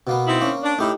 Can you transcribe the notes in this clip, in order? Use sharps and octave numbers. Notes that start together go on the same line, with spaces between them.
B2 A#3 B3
C4 D#4 E4
A#3 C#4
D4
A2 A3 D#4 G4